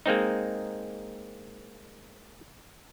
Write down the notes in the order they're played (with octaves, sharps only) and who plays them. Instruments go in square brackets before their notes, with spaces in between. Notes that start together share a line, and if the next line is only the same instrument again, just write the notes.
[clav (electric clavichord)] G#3 A#3 C4 D#4